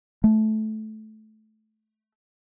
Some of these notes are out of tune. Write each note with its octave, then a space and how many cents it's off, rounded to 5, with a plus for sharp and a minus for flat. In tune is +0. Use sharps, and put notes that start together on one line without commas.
A3 -20